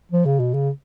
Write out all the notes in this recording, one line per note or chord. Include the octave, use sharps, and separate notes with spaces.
F3
C#3
B2
C#3